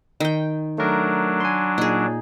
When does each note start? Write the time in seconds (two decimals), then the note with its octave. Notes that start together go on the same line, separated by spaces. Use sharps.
0.20 D#3 G5
0.78 F#3 A3 D4 A#4
1.40 G#5 C6
1.78 A#2 D#4 G#4